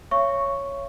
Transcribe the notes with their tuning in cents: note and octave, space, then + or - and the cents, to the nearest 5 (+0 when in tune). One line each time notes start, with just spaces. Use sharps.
C#5 +0 E5 +45 C#6 +0